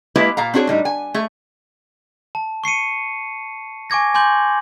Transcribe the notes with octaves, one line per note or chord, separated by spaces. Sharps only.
G#3 A#3 E4 G4 B4 E5
A#2 F5 A#5
C4 D4 F#4 G#4 C#5
A2 G3 D#4
G#5
A3 G#4
A5
C#6 C7 C#7 D#7
G#5 C#6 D6 G#6 A#6
G#5 C6 D6 G6 F#7